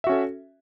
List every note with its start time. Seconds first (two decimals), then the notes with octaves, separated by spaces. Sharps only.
0.04 E5
0.07 F#4
0.09 C#4
0.12 A4